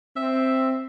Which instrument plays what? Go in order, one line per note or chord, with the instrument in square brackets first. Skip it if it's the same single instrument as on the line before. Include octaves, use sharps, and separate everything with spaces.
[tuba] C4 [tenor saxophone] E5